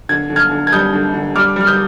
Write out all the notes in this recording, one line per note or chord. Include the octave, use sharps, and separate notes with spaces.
D3 G#6
D3
F6 G#6
D3
G#6
G3 D#6 G6
D3
D3
G3 D6 F6
G3 F6
D#6 G6